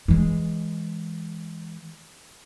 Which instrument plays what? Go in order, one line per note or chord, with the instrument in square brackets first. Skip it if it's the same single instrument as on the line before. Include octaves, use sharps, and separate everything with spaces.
[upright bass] E3 G#3